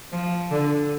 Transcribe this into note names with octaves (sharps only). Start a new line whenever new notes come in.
F3
D3